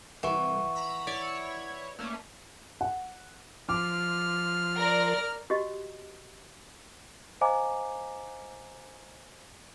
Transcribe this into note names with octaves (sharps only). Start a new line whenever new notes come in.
C2 E3 F#5 C#6
A#5 B5 E6
E4 C#5 D5
A3 A#3 C#4
F#5
F3 D6 F6
A#4 D5
F#4 G4 D#5
C5 D#5 F5 G#5 A#5 D6